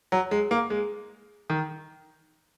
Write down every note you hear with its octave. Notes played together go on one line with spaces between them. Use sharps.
F#3
G#3
A#3
G#3
D#3